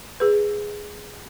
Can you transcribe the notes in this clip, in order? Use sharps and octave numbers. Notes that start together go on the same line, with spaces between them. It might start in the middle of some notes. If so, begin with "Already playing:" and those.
G#4 B4